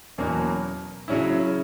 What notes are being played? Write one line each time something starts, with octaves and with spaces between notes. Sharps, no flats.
E2 B2 F#3 A#3 C#4
C#3 F#3 C#4 E4